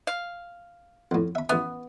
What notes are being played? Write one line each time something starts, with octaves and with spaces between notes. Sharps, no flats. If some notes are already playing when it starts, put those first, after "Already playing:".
F5
F2 A2
E5 B5
A1 B3 E5